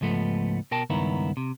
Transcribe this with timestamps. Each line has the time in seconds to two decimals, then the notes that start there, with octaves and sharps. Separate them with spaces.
0.01 C#2 G#2 F3 A3 B3
0.71 B2 A#4 G5 A5
0.90 C#2 G2 D#3 B3 E4 A#4
1.37 C3